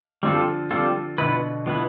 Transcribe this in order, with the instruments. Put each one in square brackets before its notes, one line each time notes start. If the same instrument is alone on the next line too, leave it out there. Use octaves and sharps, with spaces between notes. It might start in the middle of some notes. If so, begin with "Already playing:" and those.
[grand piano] D3 F3 [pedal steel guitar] G3 C4 F4 A4
[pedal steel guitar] G3 C4 F4 A4
[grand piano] B2 D3 [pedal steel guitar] F3 B3 E4 B4
[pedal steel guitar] F3 B3 E4 B4